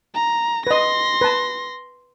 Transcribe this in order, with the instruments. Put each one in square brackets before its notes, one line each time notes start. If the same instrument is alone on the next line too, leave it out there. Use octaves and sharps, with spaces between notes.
[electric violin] A#5
[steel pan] B4 D#5 [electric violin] C6 A#6
[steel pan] B4 A5